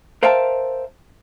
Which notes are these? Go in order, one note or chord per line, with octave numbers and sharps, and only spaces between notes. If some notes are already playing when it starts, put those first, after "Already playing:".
A#4 C5 E5 F5 G5 A5